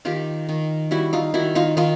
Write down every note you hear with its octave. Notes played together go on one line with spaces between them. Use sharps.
D#3 F4 G4
D#3
G3 E4 F#4
D#4 F4
D#3 E4 F#4
D#4 F4
D#3 D#4 F4